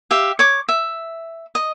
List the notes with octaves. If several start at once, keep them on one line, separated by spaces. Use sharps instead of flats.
G4 E5 F5
C#5 D6
E5
D#5